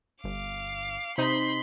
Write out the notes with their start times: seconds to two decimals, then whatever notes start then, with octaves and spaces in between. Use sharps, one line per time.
0.24 G1 F5 D6
1.18 C3 D#4 C5 B5 C6